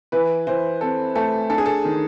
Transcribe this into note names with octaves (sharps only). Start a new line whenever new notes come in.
E3 B4
E3 C5
C4 A4
A3 A4
D4 A4
G#4
A4
D#3